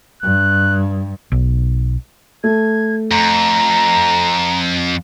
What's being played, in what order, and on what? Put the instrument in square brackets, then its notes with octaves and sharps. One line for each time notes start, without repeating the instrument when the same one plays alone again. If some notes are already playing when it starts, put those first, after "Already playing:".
[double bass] G2 [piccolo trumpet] F#6
[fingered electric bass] B1
[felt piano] A3 [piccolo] G#6
[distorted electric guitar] F2 [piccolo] A#5